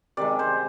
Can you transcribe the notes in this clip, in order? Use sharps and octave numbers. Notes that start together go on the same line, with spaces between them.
C3 D#3 G#3 D5
C5